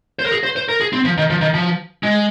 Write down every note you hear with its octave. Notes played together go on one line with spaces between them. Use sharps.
C5
A#4
G#4
C5
C5
A#4
G#4
C4
F3
D#3
F3
D#3
F3
G#3